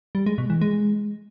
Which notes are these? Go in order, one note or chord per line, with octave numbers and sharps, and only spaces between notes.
G3
G#3
B2
E3
G#3